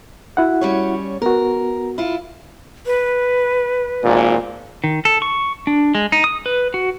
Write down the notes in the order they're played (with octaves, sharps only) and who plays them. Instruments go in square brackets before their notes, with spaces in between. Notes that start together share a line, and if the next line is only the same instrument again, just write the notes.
[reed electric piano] E4 F#4 F#5
[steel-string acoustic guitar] G3 C#4 C#5
[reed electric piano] B3 F#4 [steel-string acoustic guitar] A#4
[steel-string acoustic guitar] E4 F4
[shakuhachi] B4
[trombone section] G#1 A#2
[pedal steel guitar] D#3
A4
C#6
D4
G#3
D#4
D#6
B4
F#4